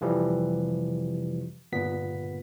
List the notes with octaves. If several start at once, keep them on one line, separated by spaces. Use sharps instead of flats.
F2 C3 E3 F3 G3
G1 A#2 B3 B6